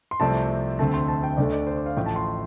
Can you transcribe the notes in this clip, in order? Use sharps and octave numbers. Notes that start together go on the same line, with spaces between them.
C6
C2 C3 F3 A3 C4 A5
D2 D3 A3 C4 A5
C6
A5
G5
D2 D3 A3 D5
D5
C5
D5
F5
A1 A2 F3 A3 G5
A5
C6